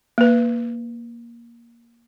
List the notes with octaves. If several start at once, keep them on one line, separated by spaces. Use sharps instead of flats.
A#3 B4